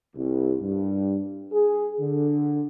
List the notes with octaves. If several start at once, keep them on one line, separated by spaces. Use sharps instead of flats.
C2
G2
G#4
D3